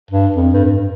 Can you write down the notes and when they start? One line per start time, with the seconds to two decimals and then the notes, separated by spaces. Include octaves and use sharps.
0.11 G2
0.36 F2
0.53 G2
0.65 G2